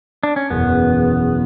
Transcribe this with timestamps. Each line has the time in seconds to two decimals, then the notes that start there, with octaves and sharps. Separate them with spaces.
0.23 D4
0.36 C#4
0.50 F#1 E2 B2 B3